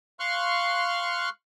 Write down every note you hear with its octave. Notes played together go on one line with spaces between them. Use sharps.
F5 C6 C#6 F6 F#6